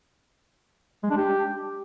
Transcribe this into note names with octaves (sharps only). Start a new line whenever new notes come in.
G#3
D4
G4